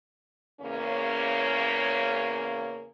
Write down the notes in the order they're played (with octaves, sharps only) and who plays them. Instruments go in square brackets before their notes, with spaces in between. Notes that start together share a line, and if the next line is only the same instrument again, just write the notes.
[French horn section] E2 C#3 A#3 C#4